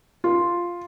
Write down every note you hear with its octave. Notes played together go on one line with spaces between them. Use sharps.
F4